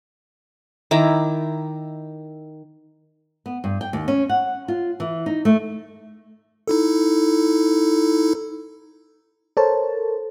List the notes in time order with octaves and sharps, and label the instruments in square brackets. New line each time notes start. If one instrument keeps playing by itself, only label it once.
[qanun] D#3 E4 A#5 D6
[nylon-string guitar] B3
G2
G5
D#2
C#4
F#5
F4
E3
D#4
A3
[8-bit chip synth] D#4 E4 A4
[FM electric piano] A4 A#4 C5 C#5 A5